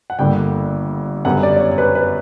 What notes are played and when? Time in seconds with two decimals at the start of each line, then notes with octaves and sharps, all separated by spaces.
0.10 F#5
0.19 G1 G2 D3 A#3 G5
1.25 F#2 D3 G3 B3 F#5
1.43 D5
1.56 D5
1.60 C#5
1.71 C#5
1.78 B4
1.95 B4